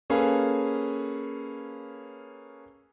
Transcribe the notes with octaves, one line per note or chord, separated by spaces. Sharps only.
A#3 C#4 G#4 A4 B4 F5